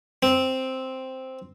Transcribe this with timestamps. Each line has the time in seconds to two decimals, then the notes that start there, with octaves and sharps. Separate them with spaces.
0.23 C4